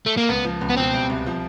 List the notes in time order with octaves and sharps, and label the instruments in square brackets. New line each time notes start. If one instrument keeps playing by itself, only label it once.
[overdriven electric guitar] A3
A#3
[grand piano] C#2 [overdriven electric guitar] B3
[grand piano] F3
C#2
[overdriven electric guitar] B3
[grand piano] B2 [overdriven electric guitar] C4
[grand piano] C2
C2
F3